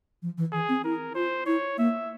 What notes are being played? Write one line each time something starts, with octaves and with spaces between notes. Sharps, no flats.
F3
E3
E3 G#4
C4
E4 A#4
F4 C5
E4 C#5
A#3 E5